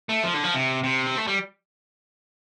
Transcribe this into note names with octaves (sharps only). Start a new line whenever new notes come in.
A3
F3
D3
F3
C3
C3
C4
A3
G3